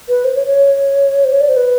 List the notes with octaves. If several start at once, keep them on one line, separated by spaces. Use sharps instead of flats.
B4
C5
C#5
C#5
C5
C#5
D5
C5
B4